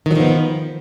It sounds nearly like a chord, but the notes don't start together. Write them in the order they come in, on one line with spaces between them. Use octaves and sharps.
D#3 F#3 F3 B3